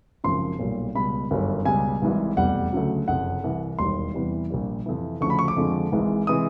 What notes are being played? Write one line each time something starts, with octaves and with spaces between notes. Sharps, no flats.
G#1 F#2 C#3 F3 C6
B1 A#2 G3
C#2 B2 G3 B5
G1 F#2 D#3 G3
C#2 B2 G3 G#5
G#1 G#2 E3 G3
F1 E2 B2 G3 F#5
D2 C#3 F#3
F#1 F2 C3 F#5
C2 C3 E3
E1 D#2 D#3 G3 C6
E2 C3 E3 G3
A#1 A#2 G3
F2 C3 E3
D2 C#3 F3 C#6
B5
C#6
D6
F2 D3 F3 G#3
G#1 G#2 E3 G#3
C3 E3 G#3 D#6